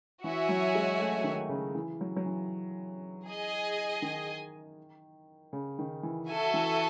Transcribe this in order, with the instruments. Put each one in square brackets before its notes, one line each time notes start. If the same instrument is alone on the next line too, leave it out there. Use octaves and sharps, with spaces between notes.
[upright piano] E3 [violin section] F#4 C#5 E5 G#5
[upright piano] F#3
G#3
A3
D#3
C#3
E3
F#3
F#3
E3
[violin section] G#4 D#5 G#5
[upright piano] D#3
C#3
D#3
E3
[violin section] F#4 A4 E5 G#5
[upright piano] E3